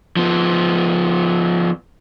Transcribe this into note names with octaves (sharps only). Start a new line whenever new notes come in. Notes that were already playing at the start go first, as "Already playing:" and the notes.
F3 B3